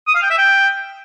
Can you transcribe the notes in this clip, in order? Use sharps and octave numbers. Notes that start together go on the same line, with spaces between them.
D#6
F5
G5
E5
G5